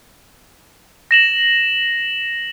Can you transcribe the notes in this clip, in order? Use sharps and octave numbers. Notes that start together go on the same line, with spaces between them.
A#6 E7 F#7